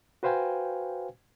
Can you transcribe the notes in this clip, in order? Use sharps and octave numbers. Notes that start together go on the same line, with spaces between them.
F#4 B4 C5 F5 G5 G#5